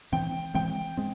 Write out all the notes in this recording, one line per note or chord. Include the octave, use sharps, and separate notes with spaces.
E3 G#3 C4 G5
E3 G#3 C4 G5
G#3 C4